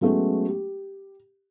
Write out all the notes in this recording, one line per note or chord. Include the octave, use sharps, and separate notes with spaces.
F#3 G#3 A3 B3 C#4 F#4
G4